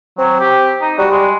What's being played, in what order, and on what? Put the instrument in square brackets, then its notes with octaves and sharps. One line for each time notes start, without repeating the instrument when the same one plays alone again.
[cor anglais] F#3 [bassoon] C4
[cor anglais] G4
D#4
[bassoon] G3 [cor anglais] F#4
[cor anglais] G#3